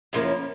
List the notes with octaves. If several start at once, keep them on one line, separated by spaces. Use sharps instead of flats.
F#2 C#3 F3 A#3 C#4